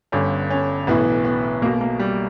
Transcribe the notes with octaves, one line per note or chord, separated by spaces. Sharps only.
G1 G2 D3 C#4
C#4
B1 A2 E3 B3
B3
B1 B2 A#3
A#3
G3